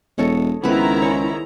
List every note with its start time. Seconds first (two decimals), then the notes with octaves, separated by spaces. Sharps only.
0.18 E1 A4 C#5 D#5
0.64 C#2 D#3 B3 C4 E4 B4 A#5
1.02 G#3 C#5